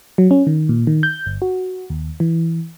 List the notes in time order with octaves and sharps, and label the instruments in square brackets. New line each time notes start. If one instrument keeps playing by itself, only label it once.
[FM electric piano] F#3
C#4
D#3
A#2
D#3
G6
G1
F#4
D#2
E3